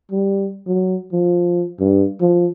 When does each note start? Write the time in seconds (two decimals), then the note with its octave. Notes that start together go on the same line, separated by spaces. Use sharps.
0.12 G3
0.67 F#3
1.13 F3
1.80 G2
2.21 F3